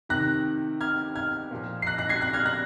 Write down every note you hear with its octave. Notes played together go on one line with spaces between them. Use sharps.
C3 D#3 F#6 A#6
F6 G#6
F6 G#6
A#2 F3
C7
F#6 A#6
F#6 A#6
G#6 C7
F#6 A#6
F6 G#6
F#6 A#6